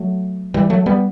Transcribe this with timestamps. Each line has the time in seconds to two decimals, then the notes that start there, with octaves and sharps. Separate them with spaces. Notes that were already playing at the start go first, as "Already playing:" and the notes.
Already playing: F#3 A3
0.54 E3 G3
0.70 F#3 A3
0.86 G3 B3